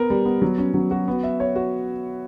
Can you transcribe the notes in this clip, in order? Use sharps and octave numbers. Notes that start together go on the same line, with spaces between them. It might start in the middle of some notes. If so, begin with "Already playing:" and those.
Already playing: B3 A#4
G3
B3
F#3
C#4
F#3
F#4
B3
E5
C#5
F#4